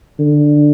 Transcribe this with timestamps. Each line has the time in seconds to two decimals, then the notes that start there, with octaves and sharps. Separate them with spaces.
0.19 D3